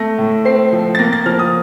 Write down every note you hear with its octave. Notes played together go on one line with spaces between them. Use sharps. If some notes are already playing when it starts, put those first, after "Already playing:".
Already playing: A3 A#6
A2
C4 C7
F3
A6
A#3 A#6
A6
F3 F6
D#6